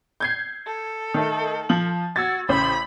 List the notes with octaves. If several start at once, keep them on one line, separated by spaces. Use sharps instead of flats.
G6 G#6 C7
A4
D#3 A3 D#4
F3 F#7
F#4 E6 G#6 A6
A1 C#3 C5 B5